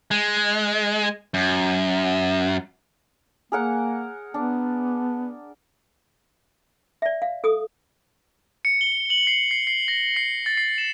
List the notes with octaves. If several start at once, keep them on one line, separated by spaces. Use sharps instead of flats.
G#3
F#2
A#3 G#4 A#4 F#5
B3 D4
D5 E5
F5
A4 D#6
C#7
G7
F#7
C7
C7
C7
A#6
C7
A6
C7
E7